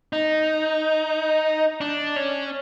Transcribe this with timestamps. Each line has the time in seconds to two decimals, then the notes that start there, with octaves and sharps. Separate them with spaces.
0.13 D#4
1.81 D4
2.16 C#4